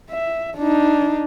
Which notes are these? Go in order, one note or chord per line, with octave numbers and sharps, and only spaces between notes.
E5
D4 D#4